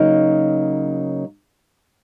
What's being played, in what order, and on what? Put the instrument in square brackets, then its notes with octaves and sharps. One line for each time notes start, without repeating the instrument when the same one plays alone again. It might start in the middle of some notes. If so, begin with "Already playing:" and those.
Already playing: [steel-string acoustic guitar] C#3 F#3 A#3 D#4